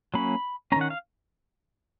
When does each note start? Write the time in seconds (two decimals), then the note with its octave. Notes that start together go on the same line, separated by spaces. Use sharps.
0.14 F#3 A#3 C#4 B5
0.72 A#3 C#4 A#5
0.76 D#3 F#5
0.90 F5